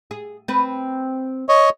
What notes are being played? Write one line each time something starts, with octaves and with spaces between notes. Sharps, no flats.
G#4
C4 B4
C#5 D#5